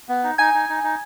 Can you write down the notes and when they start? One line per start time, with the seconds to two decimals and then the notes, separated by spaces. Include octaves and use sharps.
0.09 B3
0.24 D#4
0.38 D#4 G#5 G#6
0.54 D#4
0.69 D#4
0.84 D#4